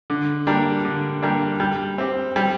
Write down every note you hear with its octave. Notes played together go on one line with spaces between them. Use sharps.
D3
G3 A#3 D4
D3
G3 A#3 D4
G3
C4 G4
G3